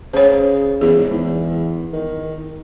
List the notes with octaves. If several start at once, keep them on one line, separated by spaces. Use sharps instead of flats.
C#3 C5 C#5
E2 G#4
G#2
E2
D#3